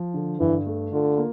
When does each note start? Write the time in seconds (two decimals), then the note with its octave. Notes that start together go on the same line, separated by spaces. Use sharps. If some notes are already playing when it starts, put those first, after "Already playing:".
Already playing: F3
0.14 D3
0.40 G2 E3
0.66 A3
0.92 D3 F4
1.18 A#3